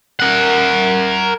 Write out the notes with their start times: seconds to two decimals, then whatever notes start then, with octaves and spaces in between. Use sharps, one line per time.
0.20 A#4 F#5